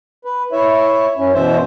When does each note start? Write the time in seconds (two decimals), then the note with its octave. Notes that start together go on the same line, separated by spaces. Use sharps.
0.25 B4
0.52 E4 C#5 E5
1.17 F#2 C#4
1.34 B2 E3 C5 E5